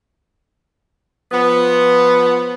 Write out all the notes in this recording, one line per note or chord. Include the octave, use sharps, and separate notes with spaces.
F3 B3